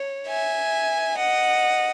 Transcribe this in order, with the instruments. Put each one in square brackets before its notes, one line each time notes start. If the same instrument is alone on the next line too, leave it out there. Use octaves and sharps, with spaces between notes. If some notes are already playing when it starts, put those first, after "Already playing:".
Already playing: [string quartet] C#5
E5 G#5
D#5 F#5